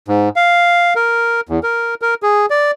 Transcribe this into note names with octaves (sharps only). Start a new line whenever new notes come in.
G#2
F5
A#4
E2
A#4
A#4
G#4
D5